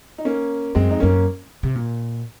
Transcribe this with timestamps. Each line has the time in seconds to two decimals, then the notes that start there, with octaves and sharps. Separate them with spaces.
0.18 D#4
0.25 A#3 C#4
0.75 F#2 G#3 C4
0.89 F2 D#4
1.00 F#2 A#3 C#4
1.63 C3
1.75 A#2